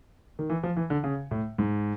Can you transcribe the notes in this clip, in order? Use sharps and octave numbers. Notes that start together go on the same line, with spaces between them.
D#3
E3
F3
E3
D3
C#3
A2
G#2